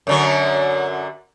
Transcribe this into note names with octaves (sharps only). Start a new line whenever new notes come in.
F#2 D3 F#3